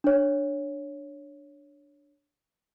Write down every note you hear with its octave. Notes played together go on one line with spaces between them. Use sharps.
D4 C#5